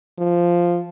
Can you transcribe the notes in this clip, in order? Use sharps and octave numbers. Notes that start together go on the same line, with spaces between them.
F3